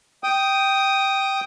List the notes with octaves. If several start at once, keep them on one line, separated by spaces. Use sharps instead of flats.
G5 D#6